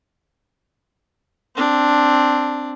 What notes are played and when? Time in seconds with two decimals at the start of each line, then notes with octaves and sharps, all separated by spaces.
1.56 C4 D4